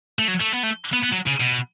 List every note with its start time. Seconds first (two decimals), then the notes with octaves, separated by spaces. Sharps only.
0.19 A3
0.28 F#3
0.41 A3
0.52 B3
0.63 A3
0.92 B3
1.03 B3
1.12 F#3
1.26 C#3
1.40 B2